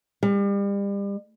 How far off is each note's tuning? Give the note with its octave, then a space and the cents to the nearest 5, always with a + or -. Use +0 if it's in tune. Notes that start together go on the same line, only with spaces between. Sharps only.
G3 +35